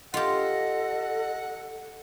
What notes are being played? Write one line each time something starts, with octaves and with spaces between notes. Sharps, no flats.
F4 G4 A4 D#5 F#5